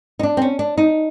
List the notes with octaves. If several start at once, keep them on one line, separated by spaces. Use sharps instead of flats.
D#4
D4
C4
C#4
D4
D#4